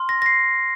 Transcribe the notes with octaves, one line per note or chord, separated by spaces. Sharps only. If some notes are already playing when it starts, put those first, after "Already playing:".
Already playing: C6 F6
A#6
A#6
C7